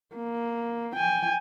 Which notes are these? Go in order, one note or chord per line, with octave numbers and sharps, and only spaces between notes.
A#3
G5 G#5